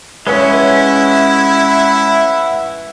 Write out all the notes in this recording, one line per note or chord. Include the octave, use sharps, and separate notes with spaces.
G#3 C#4 E4 B4 C#5 E5 F#5